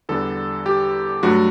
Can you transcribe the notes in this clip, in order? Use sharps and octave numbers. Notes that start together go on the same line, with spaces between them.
E2 D3 G3 A4
G4
G2 F#3 A3 F#4